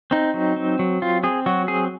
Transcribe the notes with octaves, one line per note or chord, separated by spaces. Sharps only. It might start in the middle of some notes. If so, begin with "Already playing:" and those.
C4 D#4
F#3
C4
F#3
C4 F4
C4 G#4
F#3 F#4
C4 G#4